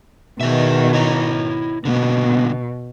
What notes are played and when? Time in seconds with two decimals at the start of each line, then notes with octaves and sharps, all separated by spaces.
0.41 B2 D#3 G#4 B4 E5
0.93 E4 C#5 A#5
1.85 B2 D3 A#3 B3